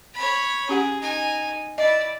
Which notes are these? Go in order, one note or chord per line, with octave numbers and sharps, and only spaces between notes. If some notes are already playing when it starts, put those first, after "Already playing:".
C#5 B5
C#4 G4 G#4 F#5
D#4 G#5
E4 D5 D#5